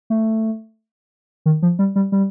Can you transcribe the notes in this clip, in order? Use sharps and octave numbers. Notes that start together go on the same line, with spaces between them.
A3
D#3
F3
G3
G3
G3